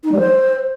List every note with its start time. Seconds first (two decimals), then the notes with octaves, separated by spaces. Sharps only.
0.03 D#4
0.11 G3
0.19 C5